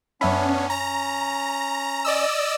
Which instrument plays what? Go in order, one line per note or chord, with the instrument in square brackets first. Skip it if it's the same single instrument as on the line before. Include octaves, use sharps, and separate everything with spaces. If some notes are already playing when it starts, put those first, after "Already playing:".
[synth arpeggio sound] F#2 E5 B5 [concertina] B3 D4 [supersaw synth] C#4
[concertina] C#4 [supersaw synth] A#5
[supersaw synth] D5 D#5 E6